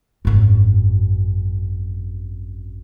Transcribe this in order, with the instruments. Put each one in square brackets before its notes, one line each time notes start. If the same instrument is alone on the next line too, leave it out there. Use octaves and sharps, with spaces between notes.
[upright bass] G#1 F#2